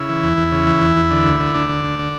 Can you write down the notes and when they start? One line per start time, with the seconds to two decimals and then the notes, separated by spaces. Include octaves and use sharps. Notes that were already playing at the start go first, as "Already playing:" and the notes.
Already playing: C#3 E4
0.09 E3
0.23 E2
0.37 E2
0.52 C#3
0.67 E3
0.81 E2
0.96 E2
1.11 D3
1.25 D2
1.40 D3
1.54 D2 D4
1.69 D3
1.84 D2
1.99 D3